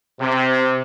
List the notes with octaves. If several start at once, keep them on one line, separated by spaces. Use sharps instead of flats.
C3